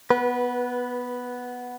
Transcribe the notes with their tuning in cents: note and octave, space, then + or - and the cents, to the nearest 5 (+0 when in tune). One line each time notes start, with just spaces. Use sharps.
B3 +0 B4 -20